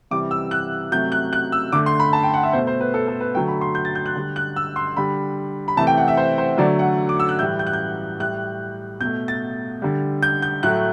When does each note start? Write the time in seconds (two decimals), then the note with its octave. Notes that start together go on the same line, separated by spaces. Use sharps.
0.11 C3 E3 G3 D6
0.31 E6
0.51 F#6
0.92 C3 F#3 A3 G6
1.12 F#6
1.33 F#6
1.52 E6
1.72 D3 A3 D6
1.86 C6
2.00 B5
2.13 A5
2.23 G5
2.34 F#5
2.43 E5
2.53 B2 A3 C5
2.67 C5
2.80 B4
2.94 A4
3.08 A4
3.20 B4
3.34 D3 F#3 A3 G5
3.48 B5
3.61 C6
3.75 G6
3.85 A6
3.95 G6
4.06 F#6
4.15 D3 G3
4.36 F#6
4.56 E6
4.76 C6
4.97 D3 G3 B5
5.68 B5
5.77 C3 E3 A3 A5
5.87 G5
5.98 F#5
6.08 E5
6.17 C5
6.38 C5
6.58 D3 F#3 A3 D5
6.79 F#5
7.09 D6
7.20 E6
7.29 F#6
7.39 A2 E3 G3 G6
7.59 G6
7.67 F#6
7.73 G6
8.20 A2 G3 F#6
9.01 B2 G6
9.05 A3
9.28 A6
9.82 D3 G3
10.23 G6
10.42 G6
10.63 A2 F#3 A3 F#6